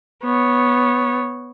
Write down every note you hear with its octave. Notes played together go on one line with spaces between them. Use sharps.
B3 C#5